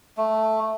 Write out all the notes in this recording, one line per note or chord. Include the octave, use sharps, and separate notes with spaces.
A3